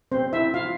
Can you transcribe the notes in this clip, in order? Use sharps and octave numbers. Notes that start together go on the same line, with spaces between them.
C4 C5
E4 E5
F4 F5